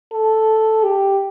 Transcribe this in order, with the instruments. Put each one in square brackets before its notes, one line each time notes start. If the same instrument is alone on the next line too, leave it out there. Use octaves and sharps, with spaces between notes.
[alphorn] A4
G4